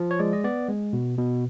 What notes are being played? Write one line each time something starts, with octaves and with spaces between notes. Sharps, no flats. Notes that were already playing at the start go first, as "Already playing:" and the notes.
Already playing: F3
C#5
G#3 D5
D#5
B3 D5
G#3
B2
B2